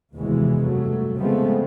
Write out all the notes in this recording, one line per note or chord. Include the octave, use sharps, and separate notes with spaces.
F1 D#2 B2 E3 G#3
G2 F#3 A3
C#3 F3 G#3 A3 B3 C4